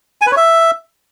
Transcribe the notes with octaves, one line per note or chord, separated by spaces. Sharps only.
G#5
B4
C#5
E5